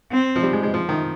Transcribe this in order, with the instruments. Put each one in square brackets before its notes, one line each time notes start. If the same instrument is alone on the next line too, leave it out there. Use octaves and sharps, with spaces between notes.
[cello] C4
[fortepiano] F3
G3
G#3
G#3
F3
D#3